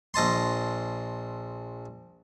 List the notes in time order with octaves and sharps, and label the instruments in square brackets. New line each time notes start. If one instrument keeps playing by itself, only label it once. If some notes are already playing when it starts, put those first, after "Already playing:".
[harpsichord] A#1 D#5 A5 C6